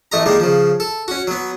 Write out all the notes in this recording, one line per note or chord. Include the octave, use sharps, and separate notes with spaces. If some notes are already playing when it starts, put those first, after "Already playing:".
A1 A3 D#5 A#5
D#3 G3 G#3 A#3
C#3 F3
A4
C#4 F#4
F#3 B3